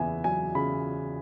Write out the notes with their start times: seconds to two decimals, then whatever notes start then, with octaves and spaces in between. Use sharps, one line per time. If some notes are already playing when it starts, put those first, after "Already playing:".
Already playing: E2 C#3 B3 E5 G#5
0.24 F#3 G#5
0.55 C#3 B5